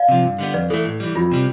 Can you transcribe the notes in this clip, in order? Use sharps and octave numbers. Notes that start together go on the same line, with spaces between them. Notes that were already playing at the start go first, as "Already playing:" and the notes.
Already playing: D5 F5
C3 F3
G2
D3 G3 B3
F2 B4 D5
E3 A3 A4
A2
E3 G3
F2 F4
C3 G3